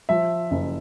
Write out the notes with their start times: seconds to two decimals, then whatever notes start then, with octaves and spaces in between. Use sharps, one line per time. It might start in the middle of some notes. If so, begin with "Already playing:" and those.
0.09 F3 E5
0.51 F#1